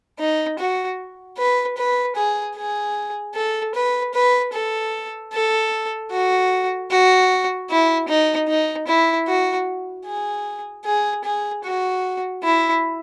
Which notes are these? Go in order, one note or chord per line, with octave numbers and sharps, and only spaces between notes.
D#4
F#4
B4
B4
G#4
G#4
A4
B4
B4
A4
A4
F#4
F#4
E4
D#4
D#4
E4
F#4
G#4
G#4
G#4
F#4
E4